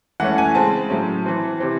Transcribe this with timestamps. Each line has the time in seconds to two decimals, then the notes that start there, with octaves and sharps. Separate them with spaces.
0.20 E3 A3 C#4 F#5
0.38 G#5
0.55 C#3 G#3 C4 A5
0.90 A2 F#3 C#4
1.26 E3 C4
1.60 C3 E3 C4